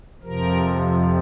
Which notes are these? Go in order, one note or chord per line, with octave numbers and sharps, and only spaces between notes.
F2 C3 F3 A#4